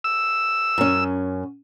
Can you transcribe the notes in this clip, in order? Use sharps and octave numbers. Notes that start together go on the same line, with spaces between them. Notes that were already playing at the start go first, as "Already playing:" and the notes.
E6
F#2 C#4